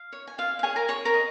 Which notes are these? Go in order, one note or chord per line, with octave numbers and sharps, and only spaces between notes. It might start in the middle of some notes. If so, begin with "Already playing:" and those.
Already playing: F5
C#5
G#5
F4 F5
F5
G#4 C#5 G#5
A#4 A#5
G#4 C#5 C#6
A#4 A#5
D#5